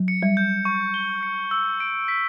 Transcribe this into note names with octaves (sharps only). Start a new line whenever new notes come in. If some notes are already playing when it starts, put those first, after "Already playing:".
Already playing: F#3
C#7
G3
G6
C#6
G7
C#7
E6
D7
B6